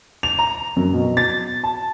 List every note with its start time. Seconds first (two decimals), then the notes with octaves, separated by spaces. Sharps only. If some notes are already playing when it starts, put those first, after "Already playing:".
0.23 F7
0.39 A#5
0.76 F#2
0.93 B2
1.17 A6
1.64 A5